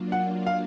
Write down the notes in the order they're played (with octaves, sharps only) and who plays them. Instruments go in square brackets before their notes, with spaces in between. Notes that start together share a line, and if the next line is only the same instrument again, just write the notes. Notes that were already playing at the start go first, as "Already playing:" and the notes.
Already playing: [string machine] F#3 A#3 D4 F4
[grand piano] F#5
F5